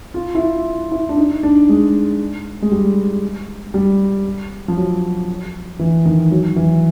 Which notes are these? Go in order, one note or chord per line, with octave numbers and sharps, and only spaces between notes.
F4
E4
F4
E4
D4
D#4
D4
G#3
G#3
G3
G3
F3
F#3
E3
D#3
F#3
E3